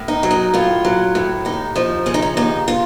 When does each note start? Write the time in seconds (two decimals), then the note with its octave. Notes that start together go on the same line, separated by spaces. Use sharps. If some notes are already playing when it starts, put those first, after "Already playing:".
Already playing: A2
0.08 D#4
0.23 F#3
0.31 D#4
0.54 A2 F4
0.85 F#3
1.15 A2
1.45 D#2 D#4
1.76 F3 D#4
2.06 C#3 C#4
2.14 D#4
2.22 C#4
2.37 D#2 D#4
2.68 F4